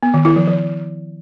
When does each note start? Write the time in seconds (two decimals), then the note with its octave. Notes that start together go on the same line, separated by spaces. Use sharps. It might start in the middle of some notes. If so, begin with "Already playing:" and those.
0.03 B3
0.14 D#3
0.25 E4
0.36 F3
0.47 F3